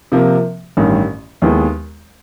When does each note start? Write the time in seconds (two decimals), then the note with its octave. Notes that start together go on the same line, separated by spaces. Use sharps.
0.12 C3 F3 A#3
0.77 A1 G2 D#3
1.42 D#2 D#3 G#3 B3 E4